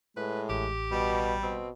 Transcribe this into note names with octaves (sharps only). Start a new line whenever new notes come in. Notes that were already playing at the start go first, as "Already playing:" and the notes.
A2 G#3 B4
A1 G4
B2 G3
B2 C4